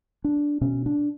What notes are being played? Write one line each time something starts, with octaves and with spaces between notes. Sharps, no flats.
D4
B2 C#4
D4